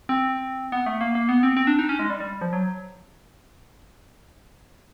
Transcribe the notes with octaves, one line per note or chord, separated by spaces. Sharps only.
C4
B3
A3
A#3
A#3
B3
C4
C4
D4
D#4
C#4
G#3
G3
G3
F3
F#3